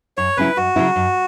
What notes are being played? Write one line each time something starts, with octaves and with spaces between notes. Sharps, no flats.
F#2 C#5
C#3 F#3 C#4 E4 B4
F#2 F#4
C#3 F#3 C#4 E4
F#2